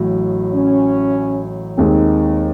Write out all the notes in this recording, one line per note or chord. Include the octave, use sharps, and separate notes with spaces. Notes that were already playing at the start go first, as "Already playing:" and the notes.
Already playing: A1 A2 F#3
C#4
D#2 D#3 G#3 C4 D#4